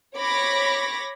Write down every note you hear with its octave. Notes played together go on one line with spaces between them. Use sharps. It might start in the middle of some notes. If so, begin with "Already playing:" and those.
C#5 B5 D6 A#6